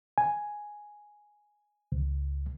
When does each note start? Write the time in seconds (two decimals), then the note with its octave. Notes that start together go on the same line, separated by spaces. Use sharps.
0.18 G#5
1.92 C#2